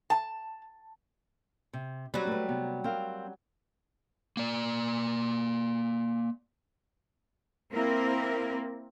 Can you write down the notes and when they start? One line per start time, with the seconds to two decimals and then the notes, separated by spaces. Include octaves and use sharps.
0.10 A5
1.73 C3
2.14 F#3 G3 C4
2.27 A3 B4
2.49 C3 B3
2.84 C4 A#4 F5
4.37 A#3 D5
7.72 A#3 C4 E4 A#4